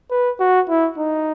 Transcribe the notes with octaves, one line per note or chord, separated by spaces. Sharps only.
B4
F#4
E4
D#4